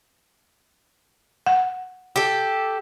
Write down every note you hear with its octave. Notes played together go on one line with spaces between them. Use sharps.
F#5
G4 A4